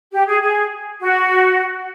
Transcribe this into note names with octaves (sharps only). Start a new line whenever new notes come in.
G4
G#4
G#4
F#4